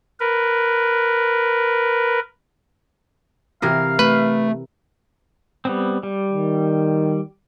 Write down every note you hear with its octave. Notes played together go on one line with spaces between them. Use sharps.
A#4 B4
C3 E3 A#4 F5
A3 B4
G3 B3 C4
G3
D#3